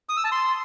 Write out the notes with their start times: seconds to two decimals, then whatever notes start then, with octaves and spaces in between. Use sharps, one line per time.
0.09 D#6
0.17 E6
0.24 A5
0.32 C6